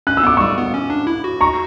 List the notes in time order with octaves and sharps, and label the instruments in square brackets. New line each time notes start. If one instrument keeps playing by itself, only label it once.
[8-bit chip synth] C#4 [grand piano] F#6
[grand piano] E6
[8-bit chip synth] B3 [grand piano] D6
[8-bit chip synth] G3 [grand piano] C#6 E6
[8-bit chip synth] B3
C#4
D4
E4
F#4
[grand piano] A#5 C#6